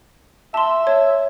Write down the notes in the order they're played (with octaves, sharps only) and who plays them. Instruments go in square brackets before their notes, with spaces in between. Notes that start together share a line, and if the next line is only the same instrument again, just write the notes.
[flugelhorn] E5 [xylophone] A5 C6
[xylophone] C#5